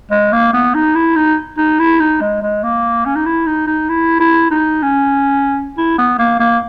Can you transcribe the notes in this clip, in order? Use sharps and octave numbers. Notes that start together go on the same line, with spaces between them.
G#3
A#3
B3
D#4
E4
D#4
D#4
E4
D#4
G#3
G#3
A#3
C#4
D#4
E4
D#4
D#4
E4
E4
D#4
C#4
E4
B3
A#3
A#3